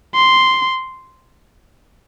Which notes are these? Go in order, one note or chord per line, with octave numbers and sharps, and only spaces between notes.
C6